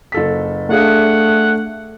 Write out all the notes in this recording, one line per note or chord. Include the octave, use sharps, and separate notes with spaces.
F#1 A4 B6
A3 D4 G#4 F5 F#5